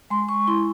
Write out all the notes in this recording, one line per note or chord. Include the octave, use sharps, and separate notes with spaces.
G#3 C6
C#6
E4 C6